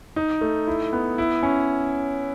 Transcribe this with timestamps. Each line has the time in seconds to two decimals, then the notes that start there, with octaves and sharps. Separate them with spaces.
0.16 D#4
0.41 A3
0.67 E4
0.93 B3
1.18 E4
1.43 C#4